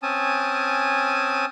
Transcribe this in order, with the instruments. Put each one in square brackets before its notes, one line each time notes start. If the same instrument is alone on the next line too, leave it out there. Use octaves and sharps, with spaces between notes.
[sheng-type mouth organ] C4 C#4 G#5 A5 D#6